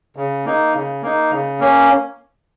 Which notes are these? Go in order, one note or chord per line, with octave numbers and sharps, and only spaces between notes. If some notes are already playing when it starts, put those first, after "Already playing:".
C#3
A#3 D#4
C#3
A#3 D#4
C#3
A#3 C#4